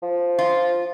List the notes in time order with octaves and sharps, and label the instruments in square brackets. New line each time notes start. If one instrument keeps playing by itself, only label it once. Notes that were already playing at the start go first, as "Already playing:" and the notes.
[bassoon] F3
[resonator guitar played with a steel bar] F4